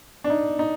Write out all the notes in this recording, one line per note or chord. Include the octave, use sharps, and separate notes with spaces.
D4
D#4
D#4